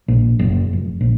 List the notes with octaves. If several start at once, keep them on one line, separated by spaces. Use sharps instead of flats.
A#1
F#1
F1
A#1